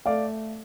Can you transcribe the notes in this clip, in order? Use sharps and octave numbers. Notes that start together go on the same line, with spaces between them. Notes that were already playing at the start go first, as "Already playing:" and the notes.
A3 D5 F5